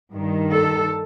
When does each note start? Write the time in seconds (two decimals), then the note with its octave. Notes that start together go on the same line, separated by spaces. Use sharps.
0.11 G2 D#3
0.52 A4